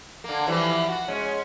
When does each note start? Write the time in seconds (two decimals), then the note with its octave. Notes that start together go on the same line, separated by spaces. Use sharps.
0.24 D3 A#3
0.47 E3 F3 G3
0.89 F#4
1.08 G#3 C#4